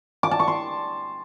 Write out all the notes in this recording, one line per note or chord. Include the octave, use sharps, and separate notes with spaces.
D6
A5
C#6
C6